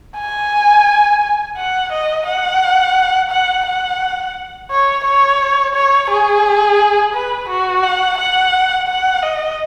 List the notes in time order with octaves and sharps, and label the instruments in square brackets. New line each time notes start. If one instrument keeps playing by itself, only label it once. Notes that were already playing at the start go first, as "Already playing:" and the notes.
[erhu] G#5
F#5
D#5
F#5
F#5
F#5
C#5
C#5
C#5
G#4
B4
F#4
F#5
F#5
F#5
D#5